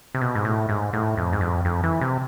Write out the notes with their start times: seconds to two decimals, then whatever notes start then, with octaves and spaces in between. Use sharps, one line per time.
0.15 C3
0.21 B2
0.35 G#2
0.45 A2
0.69 G#2
0.93 A2
1.17 F2
1.33 G#2
1.41 F2
1.65 F2
1.83 E3
2.01 C3